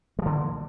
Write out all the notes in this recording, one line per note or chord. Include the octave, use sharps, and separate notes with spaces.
D3 F3 G3 A#3